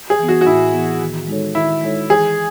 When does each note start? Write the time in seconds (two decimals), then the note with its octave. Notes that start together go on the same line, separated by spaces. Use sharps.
0.10 G#4
0.19 E3 B3
0.28 F#4
0.41 F#4
0.46 A2 E4
0.73 E3 B3
1.01 D#3
1.27 G#3 D#4 A4 C#5
1.55 D#3 E4
1.82 G#3 D#4 A4 C#5
2.09 E3 G#4